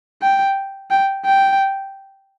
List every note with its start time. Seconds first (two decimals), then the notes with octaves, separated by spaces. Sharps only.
0.22 G5
0.91 G5
1.25 G5